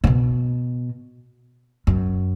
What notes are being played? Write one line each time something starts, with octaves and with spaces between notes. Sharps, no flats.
A2
B2
F#2